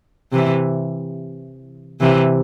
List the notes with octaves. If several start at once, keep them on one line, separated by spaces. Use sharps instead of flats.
C3 E3
C3 E3